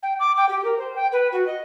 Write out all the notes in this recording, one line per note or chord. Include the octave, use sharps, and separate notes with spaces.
G5
D6
G5
G4
A#4
C5
G5
B4
F#4
D#5